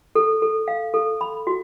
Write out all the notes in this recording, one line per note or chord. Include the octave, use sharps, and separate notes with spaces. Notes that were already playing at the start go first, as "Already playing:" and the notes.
A4
A4
F5
A4
B5
F#4